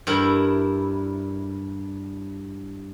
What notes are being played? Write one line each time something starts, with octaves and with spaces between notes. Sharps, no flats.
G2 E4 A#4